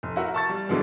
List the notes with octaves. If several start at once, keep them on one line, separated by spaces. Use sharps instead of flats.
F1
E4 F#4 A#4
A5 C#6 A6
G3
G2 B2 D3 E3 F#3 G#3